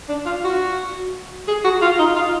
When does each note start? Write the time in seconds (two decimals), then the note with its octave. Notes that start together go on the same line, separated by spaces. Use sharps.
0.09 D4
0.26 F4
0.44 F#4
1.48 G#4
1.64 F#4
1.82 F4
1.99 D#4
2.16 F4